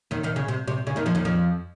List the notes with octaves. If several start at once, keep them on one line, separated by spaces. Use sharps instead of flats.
D#2 D#3
D#2 D#3
C#3
C3
C3
C#3
D#2 D#3
F2 F3
D#2 D#3
F2 F3